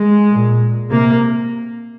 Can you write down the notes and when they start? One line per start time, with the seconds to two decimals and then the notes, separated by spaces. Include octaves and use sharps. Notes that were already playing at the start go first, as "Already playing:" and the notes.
Already playing: G#3
0.29 A#2
0.90 C3 A#3